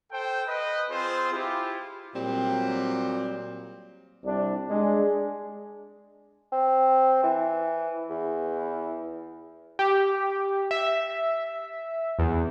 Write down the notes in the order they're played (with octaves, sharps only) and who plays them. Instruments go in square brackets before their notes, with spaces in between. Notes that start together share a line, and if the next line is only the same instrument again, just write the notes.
[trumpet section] A4 C5 G5
B4 D#5
C4 F4 G#4 C5
E4 F4 G4
[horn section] A#2 F#3 G3 C4
[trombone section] C2 D4
G#3 D4 G#4
[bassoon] C4
E3
E2
[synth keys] G4
E5
E2